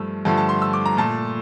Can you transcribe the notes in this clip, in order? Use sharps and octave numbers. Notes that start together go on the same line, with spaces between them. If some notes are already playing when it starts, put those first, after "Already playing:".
Already playing: G2 F3 A3 E6
G2 D3 F3 A3 A5
A5
C6
E6
D6
A#5
A#2 A3 A5